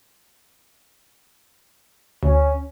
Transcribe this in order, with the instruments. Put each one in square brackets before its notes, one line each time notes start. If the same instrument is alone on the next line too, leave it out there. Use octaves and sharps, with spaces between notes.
[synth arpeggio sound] D2 [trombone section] C#4